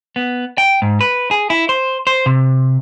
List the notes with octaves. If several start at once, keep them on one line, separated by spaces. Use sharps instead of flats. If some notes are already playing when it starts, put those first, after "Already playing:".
B3
G5
G#2
B4
G#4
E4
C5
C5
C3